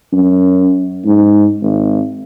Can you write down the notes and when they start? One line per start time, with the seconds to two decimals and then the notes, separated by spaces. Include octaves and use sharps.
0.13 F#2
1.05 G#2
1.62 G#1